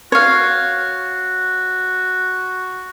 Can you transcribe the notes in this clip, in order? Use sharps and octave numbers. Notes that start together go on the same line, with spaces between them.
F#4 C#5 F5